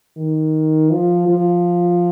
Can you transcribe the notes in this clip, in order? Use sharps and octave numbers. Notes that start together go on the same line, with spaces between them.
D#3
F3
F3